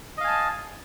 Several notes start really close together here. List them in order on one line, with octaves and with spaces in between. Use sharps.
D#5 F5 G#5 A5